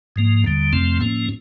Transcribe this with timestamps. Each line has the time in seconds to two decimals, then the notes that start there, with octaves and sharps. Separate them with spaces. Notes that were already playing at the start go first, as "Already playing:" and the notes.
0.16 G#2 F3 A#3
0.44 D#2 D3 G3
0.73 F2 C3 F3 A3 C4
1.00 A2 F3 A#3 C#4